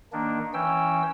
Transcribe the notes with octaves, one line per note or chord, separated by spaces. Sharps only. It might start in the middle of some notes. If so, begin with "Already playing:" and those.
D#3 A#3 D4
E3 C#4 G5 E6